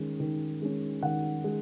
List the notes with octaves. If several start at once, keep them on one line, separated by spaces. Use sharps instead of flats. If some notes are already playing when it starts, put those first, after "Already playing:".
Already playing: D#3 G#3 C#4
D#3
G#3 C#4
D#3 F#5
G#3